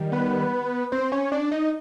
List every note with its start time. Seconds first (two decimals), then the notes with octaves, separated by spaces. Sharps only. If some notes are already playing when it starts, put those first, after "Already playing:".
Already playing: D#3 G3
0.12 B3 B4
0.92 C4 C5
1.12 C#4 C#5
1.32 D4 D5
1.52 D#4 D#5